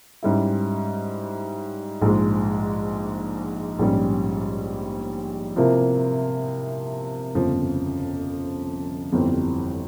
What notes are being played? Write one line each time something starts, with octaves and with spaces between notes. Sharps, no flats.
G#2 G3 C#4 E4
A#1 G#2 F3 G#3
A#1 G#2 G3 C#4
C3 F3 A#3 E4
G1 F2 C#3 F3
G1 F2 E3 G3 C4